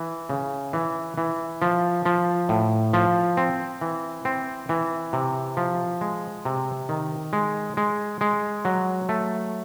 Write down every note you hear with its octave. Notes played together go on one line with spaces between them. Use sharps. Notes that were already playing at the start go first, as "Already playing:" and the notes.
Already playing: E3
C#3
E3
E3
F3
F3
A2
F3
C4
E3
C4
E3
C3
F3
G#3
C3
D#3
G#3
G#3
G#3
F#3
A3